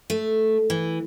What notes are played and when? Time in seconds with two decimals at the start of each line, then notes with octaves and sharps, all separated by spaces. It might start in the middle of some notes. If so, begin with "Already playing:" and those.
0.10 A3
0.70 E3